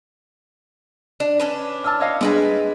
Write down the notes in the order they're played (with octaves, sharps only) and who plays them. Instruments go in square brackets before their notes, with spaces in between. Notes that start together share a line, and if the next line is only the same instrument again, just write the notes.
[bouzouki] D4
C#4 D4 B4
[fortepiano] A5 E6 F6
C#5 D#5 F5
[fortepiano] G2 [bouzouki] G#3 B4 G#5